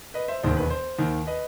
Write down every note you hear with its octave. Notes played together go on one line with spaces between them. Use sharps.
B4 D#5
C5 E5
E1 D#2 D#3 C5
B4
C5
D#2 D#3
B4 D#5